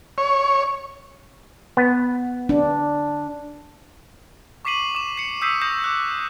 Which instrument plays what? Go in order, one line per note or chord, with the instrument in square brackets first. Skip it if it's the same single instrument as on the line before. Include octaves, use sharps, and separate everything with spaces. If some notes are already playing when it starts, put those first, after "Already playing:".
[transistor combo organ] C#5
[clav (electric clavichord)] B3
[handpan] D4
[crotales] C#6 D6 B6 C7 D#7 F#7
D6 E7
C7 C#7 F#7
D#6 E6 G6 B6 C7 D#7
D#6 G6 A#6 C7 E7
D6 F#6